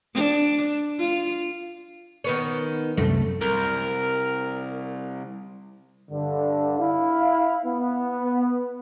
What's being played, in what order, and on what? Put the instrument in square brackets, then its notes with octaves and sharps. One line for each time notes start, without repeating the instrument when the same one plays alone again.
[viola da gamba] D4
F4
[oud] D#3 B3 C#4
[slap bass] C2 F#2 G3 [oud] A3
[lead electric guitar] C2 [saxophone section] A#4
[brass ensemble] G2 D3
E4 F5
B3